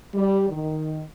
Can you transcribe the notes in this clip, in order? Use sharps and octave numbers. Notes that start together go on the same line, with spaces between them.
G3
D#3